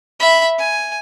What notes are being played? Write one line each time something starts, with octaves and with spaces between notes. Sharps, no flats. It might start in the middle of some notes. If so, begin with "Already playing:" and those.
E5 B5
G#5